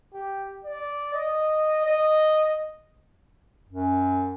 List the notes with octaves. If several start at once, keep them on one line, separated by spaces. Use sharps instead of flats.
G4
D5
D#5
D#5
F#2